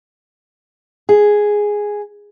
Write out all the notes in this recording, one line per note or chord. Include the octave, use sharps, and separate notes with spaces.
G#4